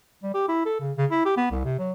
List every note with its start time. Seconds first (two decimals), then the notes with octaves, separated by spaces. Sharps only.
0.23 G3
0.34 G4
0.48 E4
0.66 A4
0.80 C#3
0.97 C#3
1.11 E4
1.26 G4
1.37 B3
1.51 C2
1.65 C3
1.79 F#3